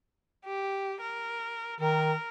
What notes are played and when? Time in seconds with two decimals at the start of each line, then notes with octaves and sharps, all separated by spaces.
0.45 G4
1.01 A#4
1.80 D#3 A#4